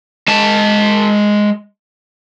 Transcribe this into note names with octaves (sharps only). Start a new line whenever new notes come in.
G#3 A5